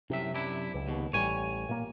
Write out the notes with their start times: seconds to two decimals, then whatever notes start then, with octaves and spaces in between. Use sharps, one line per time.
0.10 C2 F#2 C3 E5
0.33 F#2 D4 E4
0.74 C#2
0.88 D#2 B2
1.13 A1 G3 C#5 G#5
1.69 A#2 A#3